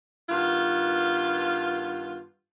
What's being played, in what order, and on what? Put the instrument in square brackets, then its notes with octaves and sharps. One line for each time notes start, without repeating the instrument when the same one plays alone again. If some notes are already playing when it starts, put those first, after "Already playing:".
[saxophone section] G2 D#3 B3 F4